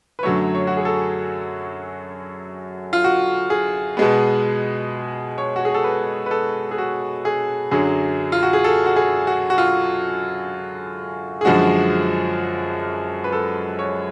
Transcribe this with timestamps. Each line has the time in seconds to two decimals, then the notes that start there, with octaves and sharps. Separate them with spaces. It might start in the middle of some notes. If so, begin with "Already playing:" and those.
0.19 B4
0.23 F#2 D3 F#3 A3 C#5
0.55 C#5
0.67 F#4
0.77 G#4
0.85 A4
2.93 F4
3.04 F#4
3.50 G#4
3.97 B2 G#3 B3
5.38 C#5
5.56 F#4
5.65 G#4
5.74 A4
5.84 B4
6.26 B4
6.31 A4
6.71 G#4
6.78 F#4
7.25 G#4
7.71 F#2 D3 F#3 G#4
8.32 F4
8.43 F#4
8.53 G#4
8.64 A4
8.86 F#4
8.96 G#4
9.27 F#4
9.50 F#4
9.58 F4
11.41 G#4
11.45 F#2 D3 F3 G#3 F#4
13.24 B4
13.33 A4
13.79 C#5